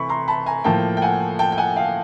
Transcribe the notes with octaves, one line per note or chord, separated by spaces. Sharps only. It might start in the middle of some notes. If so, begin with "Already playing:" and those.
Already playing: C3 E3 A3 B5 C#6
A#5 C6
A5 B5
G#5 A#5
A2 F3 A#3 G5 A5
G5
F#5 G#5
G5 A5
G5
F#5 G#5
F5 G5